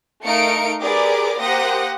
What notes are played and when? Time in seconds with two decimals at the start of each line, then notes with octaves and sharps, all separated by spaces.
0.24 A3 D#4 A#4 F5 C#7 D7
0.82 G4 G#4 A#4 B4 D5 D6
1.40 A#3 G4 C5 F#5 D#6 A#6